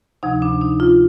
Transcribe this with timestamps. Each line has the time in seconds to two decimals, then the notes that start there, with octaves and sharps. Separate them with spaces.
0.23 D2 C3 F3 D#4
0.42 D4
0.61 D#4
0.80 F4